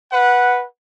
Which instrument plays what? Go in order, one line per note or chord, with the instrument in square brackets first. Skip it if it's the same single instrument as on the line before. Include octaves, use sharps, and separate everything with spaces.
[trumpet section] B4 F#5